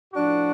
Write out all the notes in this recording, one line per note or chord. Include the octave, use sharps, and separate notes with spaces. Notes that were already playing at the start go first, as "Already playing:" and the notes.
A2 F3 D4 F#4